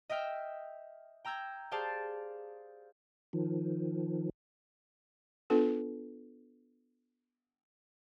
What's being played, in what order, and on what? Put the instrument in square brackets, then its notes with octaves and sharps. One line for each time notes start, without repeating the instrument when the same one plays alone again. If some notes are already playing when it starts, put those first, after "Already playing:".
[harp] D#5 E5 G5 F6
G5 A#5 E6 G6 G#6
G4 G#4 C5 D5 F5 A5
[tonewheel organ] D#3 F3
[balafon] B3 D4 F4 A4 B4